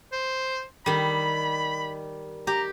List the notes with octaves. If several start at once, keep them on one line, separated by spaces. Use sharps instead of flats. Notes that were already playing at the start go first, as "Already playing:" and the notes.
C5
D#3 G3 B5
G4 A#5